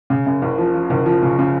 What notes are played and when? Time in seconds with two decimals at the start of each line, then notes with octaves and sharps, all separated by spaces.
0.10 C#3
0.26 F#2
0.42 F#1
0.58 F3
0.74 F3
0.90 F#1
1.06 F3
1.23 C#3
1.39 C#3